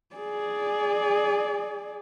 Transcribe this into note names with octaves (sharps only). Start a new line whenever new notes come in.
G#4 D5